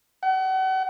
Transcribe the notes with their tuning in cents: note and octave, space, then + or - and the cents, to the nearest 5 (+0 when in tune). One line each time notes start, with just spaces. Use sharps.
F#5 +35